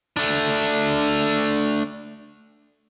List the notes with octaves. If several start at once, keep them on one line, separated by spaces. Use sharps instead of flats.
A3 D4